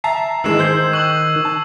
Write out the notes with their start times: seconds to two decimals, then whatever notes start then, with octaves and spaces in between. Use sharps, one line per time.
0.04 E5 A5 A#5 C7
0.44 G#2 D#3 E3 G#3 E6 C7 E7
0.59 C5 G6 G#6 C7
0.93 C#6 E6 F#6 F#7
1.45 A5